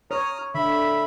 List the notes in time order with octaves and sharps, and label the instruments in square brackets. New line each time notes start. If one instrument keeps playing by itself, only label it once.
[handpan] C#5 [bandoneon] A#5 D#6 F6
[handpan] D3 [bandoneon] E5 B5